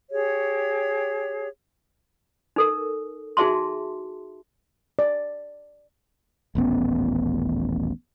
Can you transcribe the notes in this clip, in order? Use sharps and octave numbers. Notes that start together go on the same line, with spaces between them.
G4 G#4 C#5
D#4 A4 A#4
D#4 F#4 G#4 E5 A5 C6
D5
D#1 A1 B3 C#4